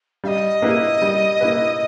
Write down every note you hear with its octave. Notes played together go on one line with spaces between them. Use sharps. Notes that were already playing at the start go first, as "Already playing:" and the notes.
G3 D#5 F5
A#3 E4 G4 B4
G3
A#3 E4 G4 B4